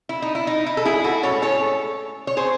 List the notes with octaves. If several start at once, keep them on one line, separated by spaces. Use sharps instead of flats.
E4
D#4
E4
D#4
E4
A4
E4 G#4
F#4 A4
A2 G#3 C#4 A4 C#5
A4 C#5
C#5
G#4 C5